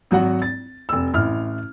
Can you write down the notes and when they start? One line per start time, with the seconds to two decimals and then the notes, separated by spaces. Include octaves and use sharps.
0.11 G#1 F#3 F#4 F#5
0.42 A6
0.89 F1 E6
1.14 A1 E4 F6